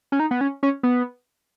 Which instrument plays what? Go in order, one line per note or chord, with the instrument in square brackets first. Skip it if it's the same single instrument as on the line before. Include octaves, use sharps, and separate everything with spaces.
[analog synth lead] C#4
D#4
B3
C#4
C#4
B3